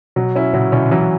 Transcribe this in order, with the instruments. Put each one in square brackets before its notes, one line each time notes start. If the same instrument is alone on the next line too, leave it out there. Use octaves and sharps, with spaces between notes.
[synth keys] B2 [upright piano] F#3
[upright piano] C#4 E4
[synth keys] A#2 C#3 [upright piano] F#3
[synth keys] B2 D3 [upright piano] C#4 E4
[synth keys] D3
[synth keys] C#3 E3 [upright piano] F#3